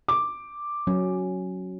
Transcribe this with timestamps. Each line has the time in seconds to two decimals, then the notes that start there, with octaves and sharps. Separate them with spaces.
0.08 D6
0.87 F#3 C#4